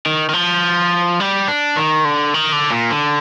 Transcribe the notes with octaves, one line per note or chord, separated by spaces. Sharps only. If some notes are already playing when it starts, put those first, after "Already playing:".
D#3
D#3
F3
G3
D4
D#3
D3
D#3
D3
A#2
D3